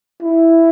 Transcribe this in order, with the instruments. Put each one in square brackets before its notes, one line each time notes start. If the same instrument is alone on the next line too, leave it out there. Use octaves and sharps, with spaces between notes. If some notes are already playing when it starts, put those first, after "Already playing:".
[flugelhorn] E4